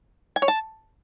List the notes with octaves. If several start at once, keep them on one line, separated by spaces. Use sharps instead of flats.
G#5
C#5
A5